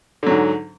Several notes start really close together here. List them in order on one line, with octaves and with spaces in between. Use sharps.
D3 F#3 G#2